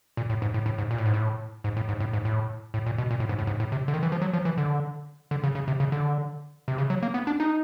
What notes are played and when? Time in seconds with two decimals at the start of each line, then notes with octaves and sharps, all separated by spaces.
0.17 A#2
0.30 A2
0.42 G#2
0.54 A2
0.66 A2
0.78 G#2
0.91 A#2
0.98 A2
1.06 G#2
1.14 A2
1.64 G#2
1.77 A2
1.89 G#2
2.00 A2
2.13 G#2
2.25 A2
2.74 A2
2.86 A#2
2.98 B2
3.11 A#2
3.20 A2
3.29 G#2
3.38 A2
3.47 G#2
3.60 A2
3.72 C3
3.88 D3
3.94 D#3
4.03 E3
4.12 F3
4.22 F#3
4.33 F3
4.45 E3
4.58 D3
5.31 D3
5.44 C#3
5.55 C#3
5.68 C3
5.80 C#3
5.92 D3
6.68 C3
6.78 C#3
6.90 F#3
7.03 A#3
7.14 B3
7.27 D4
7.40 D#4